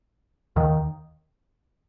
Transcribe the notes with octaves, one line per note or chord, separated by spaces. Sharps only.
D#2 D#3